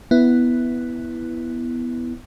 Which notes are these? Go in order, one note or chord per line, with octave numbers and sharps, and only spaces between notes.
B3 E4